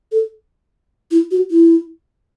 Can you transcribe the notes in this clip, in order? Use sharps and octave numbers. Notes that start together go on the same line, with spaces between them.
A4
E4
F#4
E4